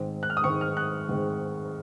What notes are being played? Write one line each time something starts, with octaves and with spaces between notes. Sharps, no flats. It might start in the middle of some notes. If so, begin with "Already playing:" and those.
Already playing: G#2 D#3 G#3 C4
F#6
F6
D#6
G#2 D#3 G#3 C4 C#6
F6
F#6
G#2 D#3 G#3 C4